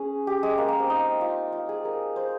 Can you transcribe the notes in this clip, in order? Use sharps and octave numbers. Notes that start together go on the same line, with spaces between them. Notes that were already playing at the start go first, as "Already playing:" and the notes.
Already playing: C#4 G#4
G4
G#3
A#3
A#3
C4
D#4
F4
F4
G#4
A#4
C5